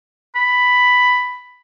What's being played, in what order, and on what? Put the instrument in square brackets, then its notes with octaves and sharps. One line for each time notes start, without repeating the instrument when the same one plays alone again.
[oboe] B5